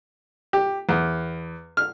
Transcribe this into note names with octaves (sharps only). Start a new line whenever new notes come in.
G4
E2
F6